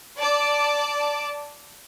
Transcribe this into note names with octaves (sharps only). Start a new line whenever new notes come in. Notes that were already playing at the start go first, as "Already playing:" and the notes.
D5 A5 D6